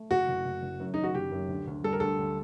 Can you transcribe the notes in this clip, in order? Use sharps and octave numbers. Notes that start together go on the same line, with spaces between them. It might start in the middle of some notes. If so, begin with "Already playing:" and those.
Already playing: A3
F#1 F#4
F#1
F#1
F#1
F#2
D#3 D#4
F#4
F#1 G4
F#2
D2
D2
G3 A4
A#4
D2 A4
D2